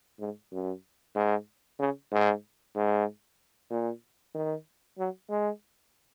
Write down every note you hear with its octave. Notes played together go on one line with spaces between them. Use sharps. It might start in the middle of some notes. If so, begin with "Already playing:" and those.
G#2
F#2
G#2
C#3
G#2
G#2
A#2
D#3
F#3
G#3